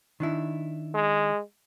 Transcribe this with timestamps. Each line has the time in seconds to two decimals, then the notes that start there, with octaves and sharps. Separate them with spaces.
0.20 D#3 D4 E4
0.95 G#3